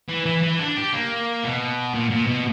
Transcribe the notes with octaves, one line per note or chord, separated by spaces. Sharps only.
E3
E3
E3
D4
G4
A#3
B2
A#2
A#2
B2